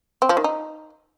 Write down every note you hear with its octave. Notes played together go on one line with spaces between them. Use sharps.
C4
F3
D#3
D#4